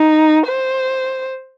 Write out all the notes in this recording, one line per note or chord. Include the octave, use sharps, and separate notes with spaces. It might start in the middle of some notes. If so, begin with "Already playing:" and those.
Already playing: D#4
C5